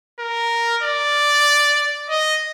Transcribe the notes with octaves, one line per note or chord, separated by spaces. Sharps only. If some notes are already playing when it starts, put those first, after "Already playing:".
A#4
D5
D#5